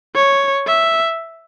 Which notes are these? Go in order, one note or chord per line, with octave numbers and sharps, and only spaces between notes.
C#5
E5